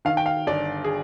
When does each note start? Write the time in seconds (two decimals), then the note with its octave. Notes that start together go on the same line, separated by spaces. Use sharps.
0.05 D#3 F5
0.17 G5
0.26 F5
0.47 G1 D5
0.84 G#4